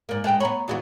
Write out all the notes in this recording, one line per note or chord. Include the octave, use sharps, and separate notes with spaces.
G#2 A#3 A#4 D5
D2 G#3 A4 B4 G5
B3 C#5 A#5 B5
D#2 E3 B3 F#4 G#4 D5